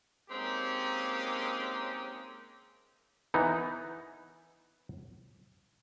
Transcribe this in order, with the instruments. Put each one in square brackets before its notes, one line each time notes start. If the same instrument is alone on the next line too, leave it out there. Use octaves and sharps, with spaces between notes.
[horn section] G#3 A#3 C4 C#4 D#4 G4
[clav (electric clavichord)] E3 B3 D#4